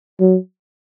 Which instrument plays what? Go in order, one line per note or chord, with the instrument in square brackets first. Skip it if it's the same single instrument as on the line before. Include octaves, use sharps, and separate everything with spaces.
[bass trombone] F#3